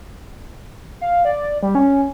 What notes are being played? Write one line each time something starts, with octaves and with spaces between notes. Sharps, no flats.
F5
D5
G3
C#4